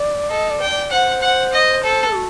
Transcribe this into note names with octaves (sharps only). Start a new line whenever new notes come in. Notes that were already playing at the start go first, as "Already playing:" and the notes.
Already playing: D5
A4 D#5
D5
G5
D5
C5 F#5
F#5
D#5
A4
F#4